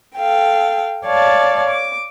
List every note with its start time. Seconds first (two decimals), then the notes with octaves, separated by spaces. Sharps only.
0.16 A4 F5 G5
1.06 C#5 D5 F5 A5
1.70 D6